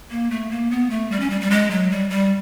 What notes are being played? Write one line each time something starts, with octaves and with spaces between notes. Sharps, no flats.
A#3
A3
A#3
B3
A3
G3
C#4
G3
G3
G#3
F#3
G3
G3